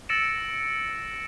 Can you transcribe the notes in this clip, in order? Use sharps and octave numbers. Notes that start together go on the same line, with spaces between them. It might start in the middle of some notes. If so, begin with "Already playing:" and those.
E6 A6 A#6 C#7 D7 E7